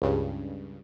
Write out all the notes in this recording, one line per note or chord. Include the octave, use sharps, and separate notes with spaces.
C#2 G2 C#3